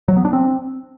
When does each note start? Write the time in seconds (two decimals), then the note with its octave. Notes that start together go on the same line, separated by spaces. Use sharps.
0.08 F#3
0.17 B3
0.25 D4
0.33 C4